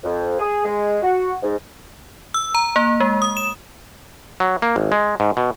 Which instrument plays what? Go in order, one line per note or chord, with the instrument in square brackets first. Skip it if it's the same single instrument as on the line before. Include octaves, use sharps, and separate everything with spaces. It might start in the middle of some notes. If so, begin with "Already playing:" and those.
[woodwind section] F2
G#4
G#3
F#4
G#2
[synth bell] E6
A#5
A#3
G#3
D#6
E7
[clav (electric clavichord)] F#3
A#3
G#1
G#3
G#2
B2